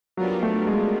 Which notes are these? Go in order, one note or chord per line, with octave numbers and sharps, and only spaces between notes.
F#3 G3 B3 D4 F4 A#4
A3
G#3